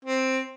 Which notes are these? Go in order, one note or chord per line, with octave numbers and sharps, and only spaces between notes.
C4